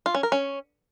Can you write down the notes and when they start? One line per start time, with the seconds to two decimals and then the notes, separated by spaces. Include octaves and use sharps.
0.06 F4
0.15 C#4
0.23 A#4
0.32 C#4